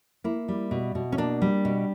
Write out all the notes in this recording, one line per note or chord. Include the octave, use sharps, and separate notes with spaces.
A#3 E4
G3
B2
B2
C#4
A#3 D4
G3
B2